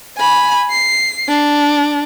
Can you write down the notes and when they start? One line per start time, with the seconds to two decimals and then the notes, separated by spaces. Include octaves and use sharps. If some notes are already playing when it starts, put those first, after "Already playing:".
0.17 G#5 B5
0.70 C7
1.28 D4